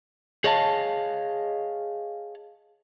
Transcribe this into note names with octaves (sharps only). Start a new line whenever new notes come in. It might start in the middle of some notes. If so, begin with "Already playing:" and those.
G#4 C#5 D#5 F5 A5